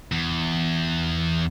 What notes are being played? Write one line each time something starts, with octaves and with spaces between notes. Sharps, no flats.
E2